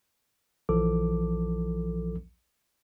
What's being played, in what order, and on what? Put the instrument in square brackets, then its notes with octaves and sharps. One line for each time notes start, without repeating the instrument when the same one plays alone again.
[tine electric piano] A#1 E3 F3 A4 D6